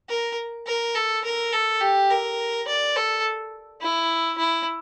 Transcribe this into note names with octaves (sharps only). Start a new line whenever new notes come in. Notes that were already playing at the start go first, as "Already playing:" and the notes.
A#4
A#4
A4
A#4
A4
G4
A#4
D5
A4
E4
E4